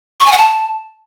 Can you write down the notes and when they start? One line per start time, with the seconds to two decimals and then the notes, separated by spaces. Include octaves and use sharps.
0.20 C#6
0.26 G#5
0.32 F#5
0.38 A5